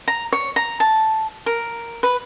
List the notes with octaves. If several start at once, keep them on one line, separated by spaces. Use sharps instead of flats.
A#5
C#5
A#5
A5
A#4
B4